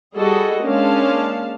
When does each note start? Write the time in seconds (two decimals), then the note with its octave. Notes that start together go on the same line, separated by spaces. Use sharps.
0.17 G3 F#4 G#4 A4 D#5
0.63 G#3 A#3 C#4 D4 F5 A5